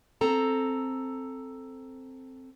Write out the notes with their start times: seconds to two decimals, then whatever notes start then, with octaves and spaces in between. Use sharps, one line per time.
0.21 C4 A4 A#5